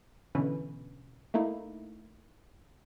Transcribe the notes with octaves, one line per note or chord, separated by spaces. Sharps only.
B2 D3 E3 C#4 B4
A3 A#3 D#4 E4